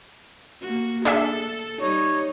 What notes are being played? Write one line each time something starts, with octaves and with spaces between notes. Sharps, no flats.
A#3 F#4
D4 G#4 A4 E5
G3 D#4 C#5